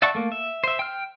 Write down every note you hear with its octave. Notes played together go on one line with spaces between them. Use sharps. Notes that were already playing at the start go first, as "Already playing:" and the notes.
D5 E5 F#5 A5 C#6
A3 A#3
E5
C5 E5
G5 F6